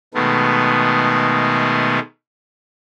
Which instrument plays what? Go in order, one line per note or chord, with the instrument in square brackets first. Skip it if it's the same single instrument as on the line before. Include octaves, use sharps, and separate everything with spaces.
[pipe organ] B2 D#3 G#3 A3 B3